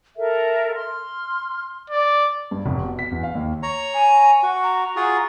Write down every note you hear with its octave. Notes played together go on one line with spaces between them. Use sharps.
A4 A#4 E5
C6 F6
D5
G2
F1
B2
B6
E2
F5
D#2
C#5 A#5
G#5
F#4
A#5
F4 F#4 G#4